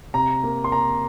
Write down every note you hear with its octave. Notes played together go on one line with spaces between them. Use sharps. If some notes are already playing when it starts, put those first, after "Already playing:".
C3 A#5
A#3
C6
A#3 A#5